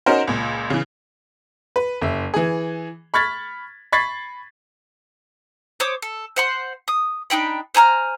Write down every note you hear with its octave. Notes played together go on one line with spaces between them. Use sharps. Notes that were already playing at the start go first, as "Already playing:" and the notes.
C#4 D#4 F#4 A#4 C5
C#2 A#2
C#3 E3
B4
F#1 E5
E3 G#4
B5 C#6 F6 G#6 A6 B6
B5 C#6 G#6 A6 B6 C7
C5 C#5 D6 D#6
A4
C5 F#5 C6
D#6
D4 D#4 G5 B5
C5 G#5 A#5 F6